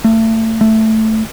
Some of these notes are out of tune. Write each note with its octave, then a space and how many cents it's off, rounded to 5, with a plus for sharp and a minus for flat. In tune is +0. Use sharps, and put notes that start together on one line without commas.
A3 +30
A3 +0